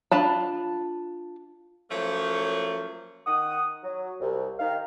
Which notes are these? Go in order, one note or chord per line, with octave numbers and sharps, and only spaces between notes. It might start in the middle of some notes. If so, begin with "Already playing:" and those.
D4 F4 A5 B5
F3 F#3 A3 A#3 C#4
D#3 F#5 D#6
F#3
C2
D#3 F5